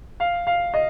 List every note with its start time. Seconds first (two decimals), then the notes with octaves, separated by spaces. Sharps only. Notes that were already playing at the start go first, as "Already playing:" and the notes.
0.20 F5
0.47 F5
0.74 D#5